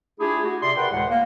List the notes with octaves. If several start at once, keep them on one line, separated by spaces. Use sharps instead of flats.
A3 D4 E4 F4 G4 G#4
F#4
C3 G4 D5 E5 C6
A#4 B4 D5 F#5 G5 C6
D2 A2 E3 G#3 A3 F#5
A#3